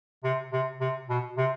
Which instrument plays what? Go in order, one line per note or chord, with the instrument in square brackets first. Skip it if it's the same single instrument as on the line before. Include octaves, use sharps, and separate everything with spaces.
[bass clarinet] C3
C3
C3
B2
C3